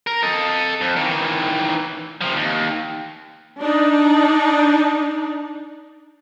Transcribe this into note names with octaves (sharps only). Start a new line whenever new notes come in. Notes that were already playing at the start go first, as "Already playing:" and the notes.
A#4
A4 D#5
F2
D#3 E3
C3 F3
D#2
D4 D#4